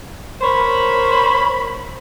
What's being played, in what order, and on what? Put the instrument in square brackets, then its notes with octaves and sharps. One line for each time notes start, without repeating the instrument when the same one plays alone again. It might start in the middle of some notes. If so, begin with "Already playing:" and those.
[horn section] A#4 C5 C#5 B5